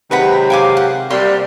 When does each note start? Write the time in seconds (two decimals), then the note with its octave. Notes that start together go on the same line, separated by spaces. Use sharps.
0.11 C3 D#3 F#3 G#3 B4 F#5 B5
0.50 F5 G5 G#5 D6
0.77 F#5
1.11 C3 G3 A#3 D5 C6